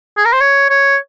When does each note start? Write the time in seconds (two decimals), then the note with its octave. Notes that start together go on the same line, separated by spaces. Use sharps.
0.17 G#4
0.26 A#4
0.33 C5
0.41 C#5
0.70 C#5